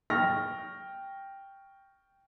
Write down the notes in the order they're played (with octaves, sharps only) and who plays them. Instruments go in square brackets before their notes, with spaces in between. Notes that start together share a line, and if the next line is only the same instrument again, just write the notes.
[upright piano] G5 C#6 F6 A#6